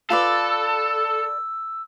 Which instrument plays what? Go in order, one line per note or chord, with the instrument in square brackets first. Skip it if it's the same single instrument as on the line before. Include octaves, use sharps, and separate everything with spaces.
[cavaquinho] F4 B4 D5 [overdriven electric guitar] A4 [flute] E6